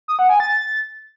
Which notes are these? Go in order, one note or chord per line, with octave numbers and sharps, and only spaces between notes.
D#6
F#5
G#5
A6